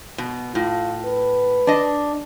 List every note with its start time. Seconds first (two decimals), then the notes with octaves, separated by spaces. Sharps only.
0.18 B2
0.55 A2 F4
1.05 B4
1.67 D4 D#5